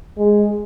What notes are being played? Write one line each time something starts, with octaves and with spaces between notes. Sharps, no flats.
G#3